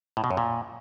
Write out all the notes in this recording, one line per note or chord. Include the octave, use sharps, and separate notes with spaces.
A2
B2
F#2
A#2